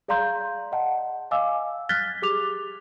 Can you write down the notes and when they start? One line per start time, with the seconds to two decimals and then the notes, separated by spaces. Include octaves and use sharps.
0.08 G#4 D5 F5 A#5 C6 G6
0.72 D#5 F#5 A5
1.31 D#5 F5 G#5 D6 E6
1.89 F6 F#6 G#6 A6 B6 G7
2.22 G4 G#4 D6 F7